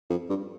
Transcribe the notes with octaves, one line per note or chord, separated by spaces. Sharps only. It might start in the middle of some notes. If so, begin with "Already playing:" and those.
F2
G2